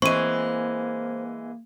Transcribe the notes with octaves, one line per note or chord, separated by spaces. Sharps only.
E3 G#3 A#3 C4 C#6 D#7